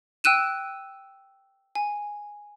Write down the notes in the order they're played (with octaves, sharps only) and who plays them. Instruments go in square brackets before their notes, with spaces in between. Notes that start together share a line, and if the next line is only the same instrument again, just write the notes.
[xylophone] G5 E6 F#6 D#7 E7
G#5